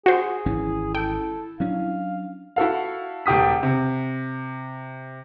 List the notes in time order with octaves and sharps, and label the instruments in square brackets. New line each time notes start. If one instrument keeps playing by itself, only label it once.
[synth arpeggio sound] F#4 C5 [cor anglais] G#4
[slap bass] G#1 E3 C#4 [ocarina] E4
[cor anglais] A4 [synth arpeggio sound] G5
[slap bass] F#3 C#4 D4 [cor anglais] F5
[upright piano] E4 F#4 A4 F5
E1 A3 G4 D#6 B6
C3